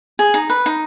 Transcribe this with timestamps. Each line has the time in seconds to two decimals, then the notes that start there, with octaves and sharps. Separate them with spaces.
0.19 G#4
0.34 D#4
0.50 B4
0.66 D#4